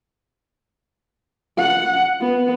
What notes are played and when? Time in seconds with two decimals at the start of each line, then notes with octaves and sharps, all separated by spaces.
1.58 F#5
2.21 B3